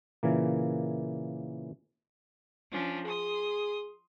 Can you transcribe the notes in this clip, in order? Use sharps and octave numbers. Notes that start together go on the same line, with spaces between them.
A#2 C#3 E3 A#3
F3 C#4 D4
G#4 C6 D#6